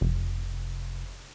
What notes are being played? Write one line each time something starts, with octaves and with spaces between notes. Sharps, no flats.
F1